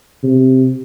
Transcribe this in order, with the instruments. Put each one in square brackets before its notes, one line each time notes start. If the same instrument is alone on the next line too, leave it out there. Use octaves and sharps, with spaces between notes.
[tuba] C3